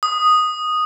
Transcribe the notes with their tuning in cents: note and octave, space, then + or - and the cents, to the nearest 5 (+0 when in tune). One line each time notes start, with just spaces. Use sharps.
D#6 -5